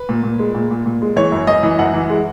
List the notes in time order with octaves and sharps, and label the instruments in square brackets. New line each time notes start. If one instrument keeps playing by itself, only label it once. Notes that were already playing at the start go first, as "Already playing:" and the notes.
Already playing: [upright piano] B4
A#2
A#2
G#3
A#2
A#2
A#2
G#3
E3 C#5
F#2
F#2 D#5
E3
F#2 F#5
E3
G#3